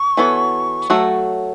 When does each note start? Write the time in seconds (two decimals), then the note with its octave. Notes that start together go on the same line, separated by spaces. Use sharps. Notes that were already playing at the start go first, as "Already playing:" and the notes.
Already playing: C#6
0.17 E3 B3 F#4 A4 C#5
0.90 F#3 A3 F#4 A4